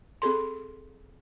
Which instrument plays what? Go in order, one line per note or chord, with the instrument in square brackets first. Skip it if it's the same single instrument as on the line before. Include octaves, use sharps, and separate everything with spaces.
[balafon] C4 G#4 A4 C6